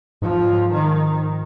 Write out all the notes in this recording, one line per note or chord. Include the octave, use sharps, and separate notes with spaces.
G#2 F3
D#3